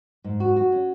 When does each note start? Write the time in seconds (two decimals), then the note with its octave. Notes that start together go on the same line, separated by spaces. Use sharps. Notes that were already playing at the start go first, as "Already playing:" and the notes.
0.24 G#2
0.40 F#4
0.56 F#4
0.72 C#4